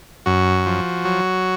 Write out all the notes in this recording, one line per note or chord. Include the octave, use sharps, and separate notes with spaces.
F#2 F#4
F3
F#3